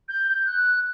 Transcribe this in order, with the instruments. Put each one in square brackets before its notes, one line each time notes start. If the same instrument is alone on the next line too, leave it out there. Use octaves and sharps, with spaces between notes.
[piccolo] G6
G6
F#6